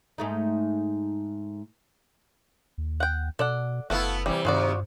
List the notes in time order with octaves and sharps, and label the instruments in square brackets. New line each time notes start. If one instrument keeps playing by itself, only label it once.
[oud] G#2 A3 D#4
[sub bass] D#2
[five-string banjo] F#5 G5
[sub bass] B2 [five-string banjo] A4 D5 F#5
[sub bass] F#1 [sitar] A3 B3 E4 [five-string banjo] F#4 A4 F5
[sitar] C3 E3 [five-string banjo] G3
[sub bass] G2 [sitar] C3 D#3 [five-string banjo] F4 F#4 D5